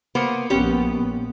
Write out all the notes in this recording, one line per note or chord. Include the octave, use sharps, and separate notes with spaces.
A#3 B3 C5
A#1 B3 C#4 G4